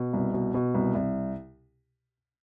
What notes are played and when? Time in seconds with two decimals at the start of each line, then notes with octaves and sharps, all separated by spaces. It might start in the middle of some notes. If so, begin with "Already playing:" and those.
Already playing: B2
0.13 C2
0.34 B2
0.54 B2
0.75 C2
0.95 C2